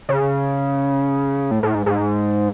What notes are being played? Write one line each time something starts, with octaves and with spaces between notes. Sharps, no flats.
C#3
A2
A2
G#2
G#2